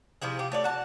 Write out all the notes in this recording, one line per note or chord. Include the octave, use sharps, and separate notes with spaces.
C3 F3 E4 G#4
F4 G4
A3 C#5 D5
F#4 A5